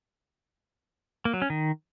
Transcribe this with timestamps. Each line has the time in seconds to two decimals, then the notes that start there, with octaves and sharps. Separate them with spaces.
1.25 A#3
1.34 F#3
1.42 C#4
1.50 D#3